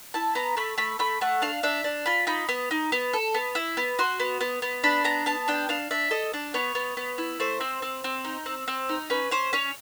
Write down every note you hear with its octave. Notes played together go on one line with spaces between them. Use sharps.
E4 A5
B3 A#5
A3 B5
A3 B5
A3 B5
A3 F#5
D4 F5
D4 E5
D4
F4 B5
D#4 B5
B3
D#4
B3
A4
B3
E4
B3
F#4 C6
B3
B3
B3
D4 B5
B3 A#5
B3 A5
D4 G5
D4 F5
D4 E5
A4 D#5
D4
B3 C#5
B3
B3
E4
A3 C5
C4
C4
C4
D#4
C4
C4
D#4
C#4 B4
C#4 C5
C#4 C#5